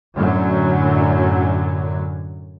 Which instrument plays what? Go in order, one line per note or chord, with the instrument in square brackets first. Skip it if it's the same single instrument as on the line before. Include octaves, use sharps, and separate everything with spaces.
[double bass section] F#2 A2 D3 F#3